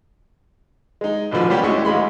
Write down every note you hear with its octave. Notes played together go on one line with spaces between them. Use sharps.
G#3 D#4
A1 B2 D3 F3 B4
G3 A#3 B3 C#4 G4
D2 G#3 C#4 D4 E4 C#6
A1 G#3 B5 C6